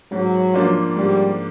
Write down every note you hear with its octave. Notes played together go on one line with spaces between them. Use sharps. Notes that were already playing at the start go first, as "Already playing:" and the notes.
G#2 F#3
F3 A#3 D4 F4
G#2 G3